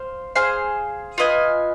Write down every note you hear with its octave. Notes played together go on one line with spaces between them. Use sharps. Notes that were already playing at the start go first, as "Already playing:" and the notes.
Already playing: C5 F5
G#4 C5 F5
F4 B4 D#5 G#5